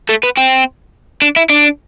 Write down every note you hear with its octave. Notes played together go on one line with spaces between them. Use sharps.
A3
B3
C4
D4
E4
D4